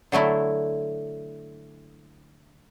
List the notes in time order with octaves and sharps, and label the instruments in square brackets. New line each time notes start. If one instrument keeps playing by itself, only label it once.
[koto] D3 F#3 A3 E4